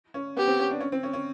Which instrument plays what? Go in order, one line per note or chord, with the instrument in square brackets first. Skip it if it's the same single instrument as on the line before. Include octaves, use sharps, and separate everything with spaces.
[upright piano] C#4
[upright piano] B3 [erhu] G4
[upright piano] C4
C#4
D4
C#4
C4
C#4
C#4